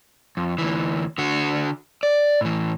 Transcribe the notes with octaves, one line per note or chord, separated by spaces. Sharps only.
F2
D2 E3
D3 F#4
D5
A2 E3